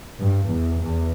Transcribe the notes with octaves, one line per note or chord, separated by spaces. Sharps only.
G2
E2
E2